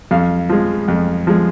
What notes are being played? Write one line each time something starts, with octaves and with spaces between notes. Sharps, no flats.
F2 F5
F3 G#3
F2
F3 G#3